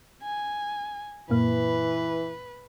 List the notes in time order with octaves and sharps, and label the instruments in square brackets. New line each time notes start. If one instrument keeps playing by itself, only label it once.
[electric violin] G#5
[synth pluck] F#2 A#2 A#3 [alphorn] E3 [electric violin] B4